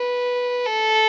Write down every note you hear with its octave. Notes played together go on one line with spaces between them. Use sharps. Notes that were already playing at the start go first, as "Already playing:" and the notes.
Already playing: B4
A4